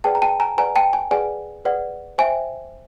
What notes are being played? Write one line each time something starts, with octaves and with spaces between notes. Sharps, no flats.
G#4 B4 D5 F#5 G5 A5
A#5
G5 A5
G#5 A#5
G#4 B4 D5 F#5 G#5 A#5
G5 A5
G#5
G#4 B4 D5 F#5 G#5
G#4 B4 D5 F#5
C5 E5 G5 G#5